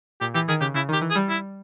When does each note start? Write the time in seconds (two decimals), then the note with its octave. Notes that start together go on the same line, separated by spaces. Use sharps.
0.21 A#2 G4
0.34 E3 G4
0.48 D#3 G#4
0.61 C#3 G4
0.74 C#3 E4
0.89 D#3 G4
1.02 E3
1.10 G#4
1.15 G3
1.29 E4